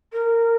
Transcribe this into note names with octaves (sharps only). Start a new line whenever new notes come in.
A#4